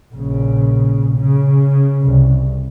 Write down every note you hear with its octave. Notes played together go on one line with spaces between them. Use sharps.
A#1 C#3
C#3
C2